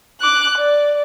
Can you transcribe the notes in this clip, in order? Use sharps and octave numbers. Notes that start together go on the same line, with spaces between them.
D6 F#6
D5